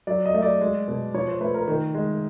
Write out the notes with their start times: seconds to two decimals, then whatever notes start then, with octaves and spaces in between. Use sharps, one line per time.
0.07 F#3 D5
0.25 D#5
0.34 A3
0.42 D5
0.61 G#3
0.88 B2
1.14 F3 C#5
1.28 C5
1.41 A3 B4
1.54 A#4
1.68 D#3
1.94 G#3